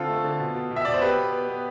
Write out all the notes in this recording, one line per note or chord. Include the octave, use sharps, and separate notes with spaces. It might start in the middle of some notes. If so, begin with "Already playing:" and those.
Already playing: D3 C4 F4 A4
A3
D3
B2
B2
B2
E5
B2 D5
C5
B3 G4 B4
B3
B3
B3